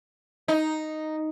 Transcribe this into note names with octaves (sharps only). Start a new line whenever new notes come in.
D#4